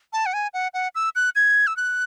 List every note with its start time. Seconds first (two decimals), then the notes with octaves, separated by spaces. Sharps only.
0.13 A5
0.26 F#5
0.33 G#5
0.53 F#5
0.74 F#5
0.95 E6
1.15 F#6
1.35 G#6
1.67 E6
1.77 F#6